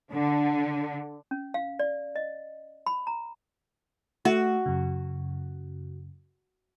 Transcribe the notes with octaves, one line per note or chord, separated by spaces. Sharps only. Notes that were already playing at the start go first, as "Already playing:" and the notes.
D3
C#4
F5
D5
D#5
B5
A#5
A3 F#4 E5
F#2 C#3